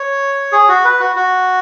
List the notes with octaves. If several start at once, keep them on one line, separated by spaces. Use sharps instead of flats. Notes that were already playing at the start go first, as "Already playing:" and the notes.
Already playing: C#5
G#4
F#4
B4
F#4
F#4